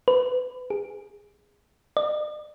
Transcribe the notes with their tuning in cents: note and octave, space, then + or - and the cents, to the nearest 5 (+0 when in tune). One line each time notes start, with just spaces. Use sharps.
B4 +30
G#4 -20
D5 +45